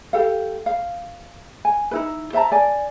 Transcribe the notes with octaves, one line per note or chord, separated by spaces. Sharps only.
G4 A4 F5
F5
G#5
D#4 E4 B4
C5 E5 A5 A#5
D5 G#5